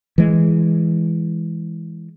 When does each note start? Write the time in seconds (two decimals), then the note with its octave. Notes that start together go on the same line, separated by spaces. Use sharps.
0.18 E3 G#3